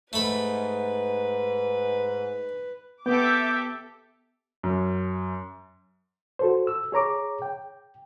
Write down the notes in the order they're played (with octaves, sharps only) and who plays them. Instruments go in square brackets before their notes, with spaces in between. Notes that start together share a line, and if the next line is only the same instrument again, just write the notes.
[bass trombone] G#2 [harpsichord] A3 B5 [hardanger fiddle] B4
[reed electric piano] B3 [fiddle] G4 A4 [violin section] E5 D6 [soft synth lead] G6
[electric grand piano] F#2
[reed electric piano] F#4 A4 C5
E6
G#4 C#5 A#5 D6
G5